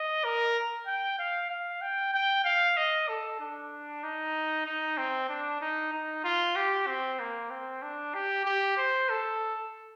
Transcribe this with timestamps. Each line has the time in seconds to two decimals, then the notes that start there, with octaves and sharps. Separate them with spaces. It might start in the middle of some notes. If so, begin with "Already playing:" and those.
Already playing: D#5
0.24 A#4
0.87 G5
1.18 F5
1.50 F5
1.81 G5
2.14 G5
2.44 F5
2.77 D#5
3.09 A4
3.40 D4
4.03 D#4
4.66 D#4
4.98 C4
5.29 D4
5.61 D#4
5.93 D#4
6.24 F4
6.56 G4
6.87 C4
7.20 A#3
7.50 C4
7.82 D4
8.14 G4
8.45 G4
8.77 C5
9.09 A4